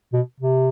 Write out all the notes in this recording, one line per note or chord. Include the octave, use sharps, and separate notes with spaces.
B2
C3